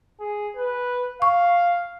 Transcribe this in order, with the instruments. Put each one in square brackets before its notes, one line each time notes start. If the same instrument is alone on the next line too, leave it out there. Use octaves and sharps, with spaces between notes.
[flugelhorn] G#4
B4
[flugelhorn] F5 [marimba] C#6